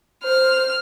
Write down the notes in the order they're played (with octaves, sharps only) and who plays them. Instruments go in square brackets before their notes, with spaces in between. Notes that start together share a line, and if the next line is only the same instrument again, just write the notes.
[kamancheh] C5 [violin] F6